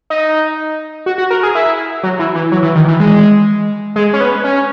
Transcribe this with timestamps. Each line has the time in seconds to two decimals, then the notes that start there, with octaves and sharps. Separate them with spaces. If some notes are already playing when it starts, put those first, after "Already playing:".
0.10 D#4
1.06 F#4
1.18 F#4
1.30 A#4
1.43 G#4
1.55 E4
2.03 F#3
2.19 E3
2.35 E3
2.52 F#3
2.63 E3
2.75 D#3
2.88 E3
3.00 G#3
3.96 G#3
4.14 C#4
4.20 B3
4.44 C#4